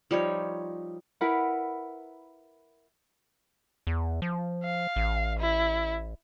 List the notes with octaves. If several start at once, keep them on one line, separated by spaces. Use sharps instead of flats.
F3 G3 D#4 C#5
E4 A#4 B4 F#5
E2
F3
F5
A1
E4